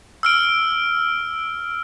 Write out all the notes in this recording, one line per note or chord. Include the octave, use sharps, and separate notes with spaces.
E6 F6 D7